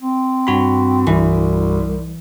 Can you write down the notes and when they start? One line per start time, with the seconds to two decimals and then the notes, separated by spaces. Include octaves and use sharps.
0.01 C4
0.47 G2 F#4 B5
1.07 C2 E3